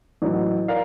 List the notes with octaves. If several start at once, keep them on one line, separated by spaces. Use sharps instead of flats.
A1 F#3
A#4 D5 F5